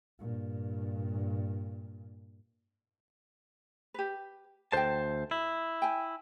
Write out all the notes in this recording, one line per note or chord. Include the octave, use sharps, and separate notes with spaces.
G2 A#2
G4 B4
D2 A4 C5 D#5 G5 A5
E4
G5 G#5